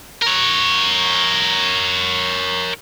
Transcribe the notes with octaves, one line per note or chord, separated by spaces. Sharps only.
A#4 C#5